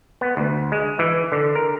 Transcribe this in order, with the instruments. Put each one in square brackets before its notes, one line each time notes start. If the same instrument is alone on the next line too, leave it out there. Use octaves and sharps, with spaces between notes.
[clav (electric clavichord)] B3
D2
G#3
E3
D3
A#4